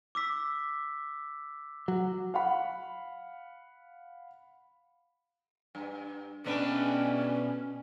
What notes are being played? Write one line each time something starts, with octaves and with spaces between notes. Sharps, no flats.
D6 E6 B6
F#3
F5 F#5 B5
G2
B2 A3 C#4 D4 B4 G5